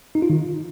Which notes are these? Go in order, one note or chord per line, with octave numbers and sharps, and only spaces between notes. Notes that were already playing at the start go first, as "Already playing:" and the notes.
D#4
F4
D#3